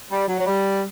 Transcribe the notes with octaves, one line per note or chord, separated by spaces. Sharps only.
G3
F#3
F#3
G3